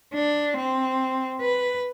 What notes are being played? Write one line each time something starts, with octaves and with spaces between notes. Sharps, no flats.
D4
C4
B4